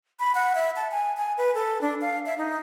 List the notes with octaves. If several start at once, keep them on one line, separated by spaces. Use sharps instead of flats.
B5
F#5
E5
A5
G#5
G#5
B4
A4
D4
F5
E5
D#4